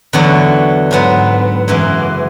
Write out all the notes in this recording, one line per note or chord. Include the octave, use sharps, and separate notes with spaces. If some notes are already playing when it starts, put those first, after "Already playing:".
E2 D3 F#3 B3 F#4
G#2 F#3 B3
F#2 C#3 E3 G#3